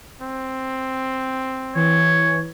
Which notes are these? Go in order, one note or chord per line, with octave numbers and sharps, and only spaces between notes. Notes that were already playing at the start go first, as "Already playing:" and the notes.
C4
E3 C#5